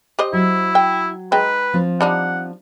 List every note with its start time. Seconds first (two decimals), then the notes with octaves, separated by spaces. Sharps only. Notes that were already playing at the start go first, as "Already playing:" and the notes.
0.19 G4 C5 D#5
0.33 F#3 E4
0.75 G5
1.32 G#3 D#4 B4 G5
1.73 F3 C4
2.01 G3 D4 D#4 F#5